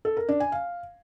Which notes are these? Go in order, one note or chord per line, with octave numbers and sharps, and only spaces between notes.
A4
A#4
D4
G#5
F5